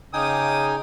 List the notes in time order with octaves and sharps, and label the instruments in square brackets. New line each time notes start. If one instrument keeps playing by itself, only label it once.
[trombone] C#3 [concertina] D#4 G5 G#5 [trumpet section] F5 D6 D#6